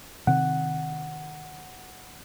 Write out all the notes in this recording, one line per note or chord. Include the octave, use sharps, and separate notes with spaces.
C3 D#3 C4 F#5